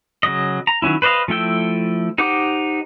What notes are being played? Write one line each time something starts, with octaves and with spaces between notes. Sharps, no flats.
C#3 F#3 D#5
A#5
D#3 F#3 C#4 E4
B4 C5 D5 D#5 F5
F3 A3 E4 G5 E6
D#4 G4 C5 F#5 D6